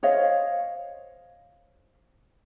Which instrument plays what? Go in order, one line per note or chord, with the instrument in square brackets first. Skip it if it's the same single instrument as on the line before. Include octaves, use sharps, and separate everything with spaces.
[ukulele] C5 C#5 D#5 F5